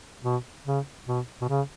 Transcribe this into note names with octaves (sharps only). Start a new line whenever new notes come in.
B2
C#3
B2
B2
C#3